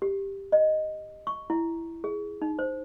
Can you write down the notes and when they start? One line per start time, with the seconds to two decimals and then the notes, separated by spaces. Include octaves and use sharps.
0.02 G4
0.52 D#5
1.27 C#6
1.50 E4
2.04 G#4
2.42 D#4
2.59 C5